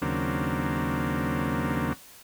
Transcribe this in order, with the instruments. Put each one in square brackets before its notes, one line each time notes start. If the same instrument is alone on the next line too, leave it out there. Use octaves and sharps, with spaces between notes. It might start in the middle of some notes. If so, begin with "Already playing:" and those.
[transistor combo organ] D#2 C#3 F#3 A#3 C4 D4